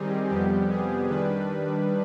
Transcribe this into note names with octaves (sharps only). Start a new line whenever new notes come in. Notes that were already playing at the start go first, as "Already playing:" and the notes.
Already playing: D#3 G3 C4 D#4 G4 G#4
F2 C3 G3 B3 G4
G#4
D#3 G3 D4 B4